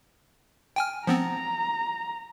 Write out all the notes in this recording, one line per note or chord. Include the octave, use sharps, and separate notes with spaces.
G5 G#5 F6
F3 B3 C4 A#5